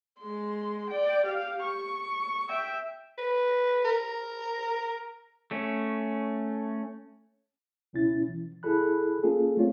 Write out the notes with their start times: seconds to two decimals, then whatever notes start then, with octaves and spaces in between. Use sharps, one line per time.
0.21 G#3 C6
0.91 D5 G5
1.26 G4 F5
1.64 C#6
2.49 E5 G5
3.18 B4
3.85 A#4
5.51 A3 C#4
7.93 C#2 B2 C#4 E4 A6
8.28 E3
8.63 C#2 E4 G#4 A4 B5 F#6
9.23 A#3 C#4 F4 G#4 A4
9.57 A3 C4 F4 C#5